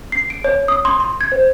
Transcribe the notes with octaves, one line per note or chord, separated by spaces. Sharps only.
C7
D7
C#5
D#6
C6
C6
G#6
C5